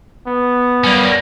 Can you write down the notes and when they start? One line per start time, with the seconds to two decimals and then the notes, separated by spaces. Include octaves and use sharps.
0.27 B3
0.84 G3 A#3 C#4